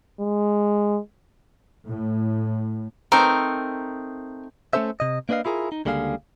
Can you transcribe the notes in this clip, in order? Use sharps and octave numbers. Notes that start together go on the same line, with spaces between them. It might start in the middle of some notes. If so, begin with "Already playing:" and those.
G#3
A2
A3 C4 D#4 A#4
A3 B3 C#4 A4 C5 E5
C3 D#5
A#3 D4 B4 D#5 F5
E4 F4 G#4 A#4
D#4
C#2 D3 G3 A#3 G#4 F5